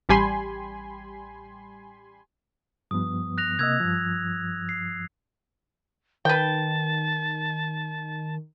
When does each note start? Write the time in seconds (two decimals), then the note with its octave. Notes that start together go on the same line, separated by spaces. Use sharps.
0.09 A1 G3 G4 G#5 B5 C6
2.91 G2 F3 B3 D#6
3.38 F#6 A#6 F7
3.59 C3 A#3 D#5 E6 F#6 G#6
3.80 G2 F3
4.69 C7
6.25 D#3 B4 G5 A5